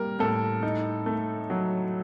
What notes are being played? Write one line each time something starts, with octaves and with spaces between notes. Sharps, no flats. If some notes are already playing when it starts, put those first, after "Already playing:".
Already playing: G3 A#3 A#4
A2 A4
D#4
A3
F#3